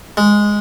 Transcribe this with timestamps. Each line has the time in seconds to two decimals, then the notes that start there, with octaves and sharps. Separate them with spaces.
0.17 G#3